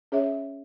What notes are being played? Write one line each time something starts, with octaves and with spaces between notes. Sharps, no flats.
C#4 G#4 C#5 E5